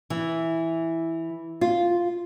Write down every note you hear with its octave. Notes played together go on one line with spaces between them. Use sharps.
E3
F4